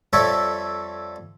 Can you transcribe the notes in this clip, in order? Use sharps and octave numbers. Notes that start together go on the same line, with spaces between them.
F2 G3 A4 C#5 E5